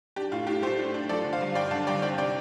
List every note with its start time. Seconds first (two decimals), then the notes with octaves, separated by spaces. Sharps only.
0.16 D4 G4
0.32 A2 F4
0.47 A2 G4
0.62 A3 G4 C5
0.78 D4
0.94 D4
1.09 F3 A4 D5
1.24 D3
1.33 C5 F5
1.41 G2
1.55 G2 D5 G5
1.71 D3 F5 A5
1.87 G2 D5 G5
2.02 C4 D5 G5
2.18 C3 D5 G5